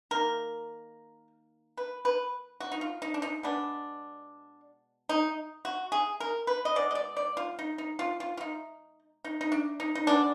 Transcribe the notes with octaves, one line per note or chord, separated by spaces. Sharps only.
D#3 A#3 A#4
B4
B4
F#4
D#4
F4
D#4
D4
D#4
B2 G#3 B3 D4
D#4
F#4
G#4
A#4
B4
D#5
B2 G#3 D5
D#5
D5
D5
F4
D#4
D#4
F4
F4
F4
D#4
D#4
D#4
D4
D#4
D#4
B2 G#3 B3 D4